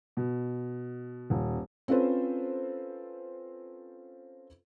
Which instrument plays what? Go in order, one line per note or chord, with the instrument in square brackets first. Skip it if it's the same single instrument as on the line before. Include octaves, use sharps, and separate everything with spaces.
[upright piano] B2
D#1
[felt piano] C4 C#4 F4 A4 B4 C5